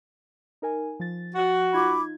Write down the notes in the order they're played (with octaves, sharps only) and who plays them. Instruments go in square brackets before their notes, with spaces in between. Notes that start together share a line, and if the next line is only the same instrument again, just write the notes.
[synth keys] D#4 A#4 G#5
F3 A6
[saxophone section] F#4
[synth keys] D#4 F4 G#6 [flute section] B5 D6